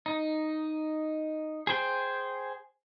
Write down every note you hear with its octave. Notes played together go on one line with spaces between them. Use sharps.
D#4
G#4 C5 G5